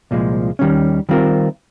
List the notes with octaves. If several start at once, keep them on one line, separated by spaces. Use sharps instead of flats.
C2 A#2 F3 G#3
D#2 D#3 G3 C#4
D#3 G3 C4 F4 A#4